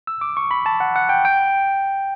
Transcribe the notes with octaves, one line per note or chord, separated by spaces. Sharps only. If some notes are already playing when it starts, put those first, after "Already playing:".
E6
D6
C#6
B5
A5
F#5
F#5
G5
G5